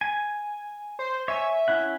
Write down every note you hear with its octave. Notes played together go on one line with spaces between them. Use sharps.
G#5
C5
C#5 E5 G#5
C#4 E4 F#5